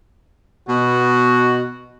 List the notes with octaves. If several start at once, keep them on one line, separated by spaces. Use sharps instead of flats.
B2 F#4